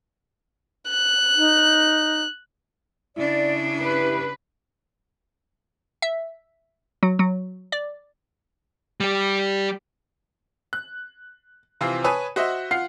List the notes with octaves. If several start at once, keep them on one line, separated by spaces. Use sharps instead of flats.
F#6
D#4
C#3 D4 E4 D5
G4 B4
E5
F#3
F#3
D5
G3 G4
F#6
C3 E3 F3 C4 F4
B4 C#5 G#5 A5 D#6
F#4 C5 D#5 E5 F#5
F4 F#5 F6 C7